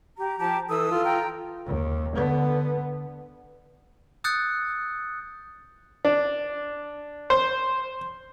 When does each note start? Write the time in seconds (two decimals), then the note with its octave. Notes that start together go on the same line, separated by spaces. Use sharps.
0.18 G4 A#5
0.39 F3 G4 A5
0.70 E3 A4 D#6 E6
0.91 F4 A4
1.04 G5 A#5
1.66 D#2
2.15 D3 B3
4.24 D#6 E6 F#6 G6 A6 C#7
6.05 D4
7.30 C5